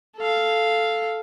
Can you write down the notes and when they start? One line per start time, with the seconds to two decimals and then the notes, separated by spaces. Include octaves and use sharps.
0.16 A4 F5